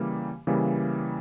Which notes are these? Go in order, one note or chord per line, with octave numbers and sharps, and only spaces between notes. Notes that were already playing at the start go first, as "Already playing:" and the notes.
Already playing: C#3 E3 G3 A#3
C#3 E3 G3 A#3